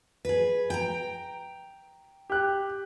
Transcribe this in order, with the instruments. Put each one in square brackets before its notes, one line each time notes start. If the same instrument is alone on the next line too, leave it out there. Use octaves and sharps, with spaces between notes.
[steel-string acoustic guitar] G#4 B4
G5 A#5
[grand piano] G4 F#6